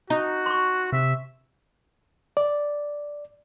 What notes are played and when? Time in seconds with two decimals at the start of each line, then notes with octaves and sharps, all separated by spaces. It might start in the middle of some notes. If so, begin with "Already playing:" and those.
0.10 D#4 F#4
0.46 C6 C#6
0.92 C3 E5
2.37 D5